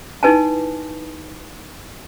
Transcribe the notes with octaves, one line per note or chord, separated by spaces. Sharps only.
D#4 E4 B4 G#5 A5